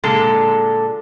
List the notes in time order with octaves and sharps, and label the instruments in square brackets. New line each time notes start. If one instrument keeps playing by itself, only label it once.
[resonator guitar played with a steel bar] A#2 D3 G#3 A4